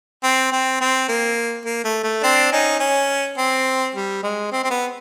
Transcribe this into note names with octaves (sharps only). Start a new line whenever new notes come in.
C4
C4
C4
A#3
A#3
A3
A3
C4 D4
C#4 D#4
C#4
C4
G3
G#3
C4
C4
B3